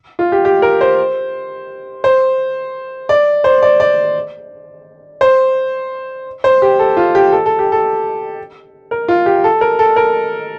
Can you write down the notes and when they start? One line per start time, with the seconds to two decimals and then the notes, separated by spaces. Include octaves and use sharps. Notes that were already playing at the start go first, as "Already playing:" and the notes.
0.19 F4
0.32 G4
0.45 G4
0.62 A#4
0.81 C5
2.04 C5
3.09 D5
3.44 C5
3.62 D5
3.80 D5
5.21 C5
6.44 C5
6.62 G4
6.79 A4
6.97 F4
7.15 G4
7.32 A4
7.46 A4
7.59 G4
7.72 A4
8.91 A#4
9.08 F4
9.26 G4
9.44 A4
9.61 A#4
9.79 A4
9.96 A#4